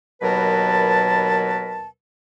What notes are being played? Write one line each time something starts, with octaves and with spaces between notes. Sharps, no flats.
D#2 B2 F#3 A#4 B4 A5